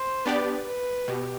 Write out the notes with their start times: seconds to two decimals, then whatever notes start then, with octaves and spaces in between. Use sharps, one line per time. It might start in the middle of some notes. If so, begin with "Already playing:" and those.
Already playing: C5
0.25 B3 D4 G4 B4 D5
0.66 B4
1.08 B2 G4